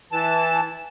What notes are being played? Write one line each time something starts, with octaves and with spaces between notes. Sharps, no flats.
E3 A5